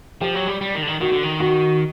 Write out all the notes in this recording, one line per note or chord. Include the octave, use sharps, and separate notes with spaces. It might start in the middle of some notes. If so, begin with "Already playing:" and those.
F3 G4
F#3
G3
G3
D#3
D3
D#3
D#3 F#4
D3
D#3
F#4